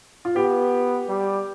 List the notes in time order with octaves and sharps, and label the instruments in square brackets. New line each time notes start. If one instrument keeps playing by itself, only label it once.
[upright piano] F4
[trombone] B3 [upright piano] G4
[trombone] G3